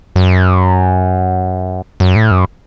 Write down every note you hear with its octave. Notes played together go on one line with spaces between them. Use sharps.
F#2
F#2
A2
F#2